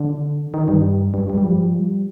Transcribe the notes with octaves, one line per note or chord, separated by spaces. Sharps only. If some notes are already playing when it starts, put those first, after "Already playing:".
Already playing: D3
D#3
G2
G2
G2
G3
F3
G3